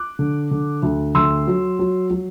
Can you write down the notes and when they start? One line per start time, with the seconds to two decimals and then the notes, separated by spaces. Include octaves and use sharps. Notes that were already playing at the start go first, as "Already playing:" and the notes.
Already playing: D6 F#6
0.19 D3
0.51 D3
0.83 D2
1.15 D2 C6 E6
1.47 F#3
1.79 F#3
2.10 F#3